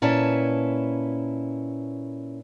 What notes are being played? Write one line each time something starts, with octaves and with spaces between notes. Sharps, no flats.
A#2 C#4 E4 B4 A5